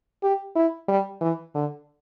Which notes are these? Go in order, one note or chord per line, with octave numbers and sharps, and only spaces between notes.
G4
E4
G3
E3
D3